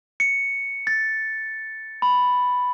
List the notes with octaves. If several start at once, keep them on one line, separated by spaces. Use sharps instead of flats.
C#7
A6
B5